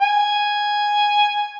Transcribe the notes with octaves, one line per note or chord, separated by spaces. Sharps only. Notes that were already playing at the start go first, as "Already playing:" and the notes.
G#5